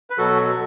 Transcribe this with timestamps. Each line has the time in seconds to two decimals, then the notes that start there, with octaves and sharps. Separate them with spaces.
0.10 B4
0.18 B2 F#3 F#4 A4